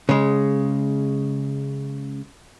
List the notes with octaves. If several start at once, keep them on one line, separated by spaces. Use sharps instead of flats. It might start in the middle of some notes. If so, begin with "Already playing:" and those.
C#3 G#3